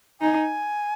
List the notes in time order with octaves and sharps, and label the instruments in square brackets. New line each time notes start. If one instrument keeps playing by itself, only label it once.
[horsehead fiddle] D#4 [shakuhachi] G#5